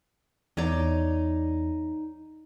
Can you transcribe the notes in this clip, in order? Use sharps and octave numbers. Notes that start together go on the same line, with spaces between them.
E2 D#4 C#5 D5